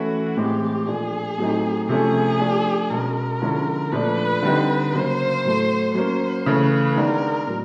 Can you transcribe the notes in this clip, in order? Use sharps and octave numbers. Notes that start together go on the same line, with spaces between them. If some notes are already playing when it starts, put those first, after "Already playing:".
Already playing: E3 A3 C#4 E4 F#4
A2 E3 G#3 C4 G4
A#2 F3 A3 D4 G#4
A2 F#3 A3 C4 D#4
C3 F3 A3 C#4 G#4
F3 A3 D4
B2 G#3 C#4 A#4
D3 F3 G#3 C#4 E4
A#2 F3 A3 D4 B4
D3 G3 C4 D#4
C#3 F#3 A#3 C5
A2 F#3 A3
F#3 A#3 C#4 C5
C#3 E3 A3 B4
D#3 G#3 B3 D4 A#4
A2 F#3